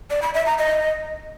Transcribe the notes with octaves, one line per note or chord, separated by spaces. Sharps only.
D5
B5
E5
A#5
D#5